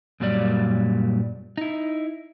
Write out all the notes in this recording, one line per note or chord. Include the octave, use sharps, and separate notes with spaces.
F#2 A#2 F#3 G3 D5
D#4 E4